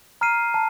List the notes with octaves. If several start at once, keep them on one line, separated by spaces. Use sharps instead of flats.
A#5 F6 C7 D#7
A5